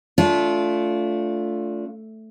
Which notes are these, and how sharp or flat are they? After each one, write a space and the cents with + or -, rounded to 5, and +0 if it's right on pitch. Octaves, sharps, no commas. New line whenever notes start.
A3 +0 D4 -30 F4 +0